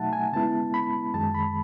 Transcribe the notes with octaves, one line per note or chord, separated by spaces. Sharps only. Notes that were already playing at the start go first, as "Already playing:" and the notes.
Already playing: B2 F#3 A3 D#4 E5 F#5 A5
G#5
C#3 G#3 B3 E4 A5
B5
F#2 D#3 G#3 A5
B5